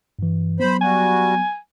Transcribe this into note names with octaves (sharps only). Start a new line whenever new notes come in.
G2 E3
F#3 B3 C5 B5
G3 F#4 G#5